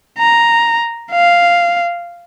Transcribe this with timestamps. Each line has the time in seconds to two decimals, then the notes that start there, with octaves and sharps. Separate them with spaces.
0.19 A#5
1.12 F5